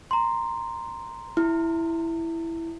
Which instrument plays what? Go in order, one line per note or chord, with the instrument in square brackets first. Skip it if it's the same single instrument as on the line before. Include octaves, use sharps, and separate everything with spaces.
[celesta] A#5 C6
[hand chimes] E4